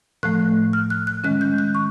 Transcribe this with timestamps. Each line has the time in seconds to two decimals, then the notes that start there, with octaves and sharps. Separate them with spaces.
0.23 A2 F3 A3 F#6
0.73 F6
0.90 F#6
1.07 F#6
1.24 D#3 G#3 C#4 F#6
1.41 G6
1.58 F#6
1.75 C#6